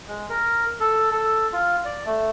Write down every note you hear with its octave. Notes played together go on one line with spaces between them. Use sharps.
G#3
A#4
A4
A4
F4
D5
A3